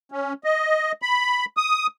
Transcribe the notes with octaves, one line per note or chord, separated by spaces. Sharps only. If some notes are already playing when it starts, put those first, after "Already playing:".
C#4
D#5
B5
D#6